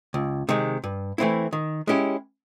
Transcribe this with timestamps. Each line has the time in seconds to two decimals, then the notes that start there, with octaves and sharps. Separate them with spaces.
0.14 C#2
0.49 C3 D#3 G#3
0.84 G2
1.18 E3 A3 C4 E4
1.53 D#3
1.87 G#3 C#4 E4 G4